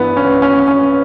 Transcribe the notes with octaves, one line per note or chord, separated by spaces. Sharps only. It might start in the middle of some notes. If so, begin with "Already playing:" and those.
Already playing: G2 E3 B3
C#4
C#4
C#4